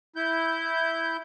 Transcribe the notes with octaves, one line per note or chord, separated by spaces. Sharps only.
E4 G6